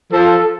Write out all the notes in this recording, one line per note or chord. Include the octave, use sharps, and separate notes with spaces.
F3 A4